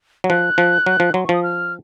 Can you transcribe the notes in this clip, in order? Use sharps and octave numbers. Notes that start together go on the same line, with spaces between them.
F#3
F3 F#6
F3
F#3
F3
F#3 C6
C#6
F3 D#6
F6